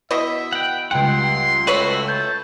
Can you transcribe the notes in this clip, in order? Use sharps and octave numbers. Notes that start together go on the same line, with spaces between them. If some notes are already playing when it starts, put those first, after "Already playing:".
B2 E4 D#5 E5
F#5 G5
C#2 G3 F#5 G5 C6
A3 F#4 B4 C#5 B5 E6
A5 G6